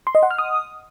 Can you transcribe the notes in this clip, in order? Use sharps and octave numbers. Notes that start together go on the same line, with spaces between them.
C6
D#5
F#5
F6
D#6